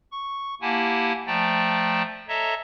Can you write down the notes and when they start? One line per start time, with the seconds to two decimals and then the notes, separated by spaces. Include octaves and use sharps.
0.12 C#6
0.61 A#3 E4 G4 F#5 G#5 A5
1.27 F3 A3 D5 G5 A5 A#5
2.28 A4 C#5 D#5 E5 A5 A#5